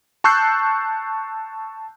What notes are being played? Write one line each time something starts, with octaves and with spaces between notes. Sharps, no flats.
A5 C#6 E6 F#6 G6 C7